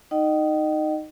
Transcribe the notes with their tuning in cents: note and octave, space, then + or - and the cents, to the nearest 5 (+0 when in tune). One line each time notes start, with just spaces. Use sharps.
D#4 +0 D#5 -30 G5 -40